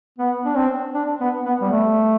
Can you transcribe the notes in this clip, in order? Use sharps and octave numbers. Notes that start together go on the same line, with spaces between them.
B3
D4
C4
D4
B3
B3
G3
A3